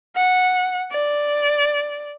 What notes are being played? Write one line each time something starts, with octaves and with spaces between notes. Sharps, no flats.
F#5
D5